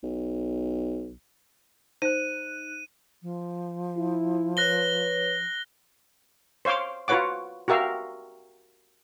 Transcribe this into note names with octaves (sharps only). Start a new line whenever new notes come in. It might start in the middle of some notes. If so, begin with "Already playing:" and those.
B1
D#4 C5 F#6 D#7
F3
E4
B4 C#5 F#6 A#6 G7
C5 C#5 F5 C6 D6
F4 F#4 B4 C#5 F#5 D6
F#4 G4 A#4 E5 F5